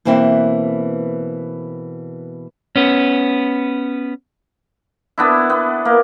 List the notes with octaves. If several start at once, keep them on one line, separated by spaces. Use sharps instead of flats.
B2 E3 A#3 C4 E4
B3 C#4
B3 D4 E4
B3
A#3